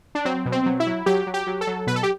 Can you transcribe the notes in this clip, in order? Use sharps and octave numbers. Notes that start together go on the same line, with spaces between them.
D4
F#3 C4
B2
C4
F#3
E4
F#3
F#3 G4
F#3
G4
F#3
A4
F#3
B2 B4
A4
G4